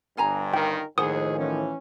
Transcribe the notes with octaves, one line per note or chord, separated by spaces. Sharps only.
G1 G2 F5 G#5 A#5
D#3 A#4 G5
D#2 A2 D#3 F3 G#4 C5 F#5 D#6
E3 C#4